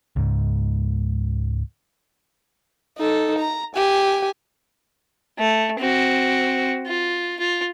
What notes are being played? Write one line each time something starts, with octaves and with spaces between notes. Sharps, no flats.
C#2 G#2
D#4 A4
A#5
G4 G#5
A3
C4 F#4
F4
F4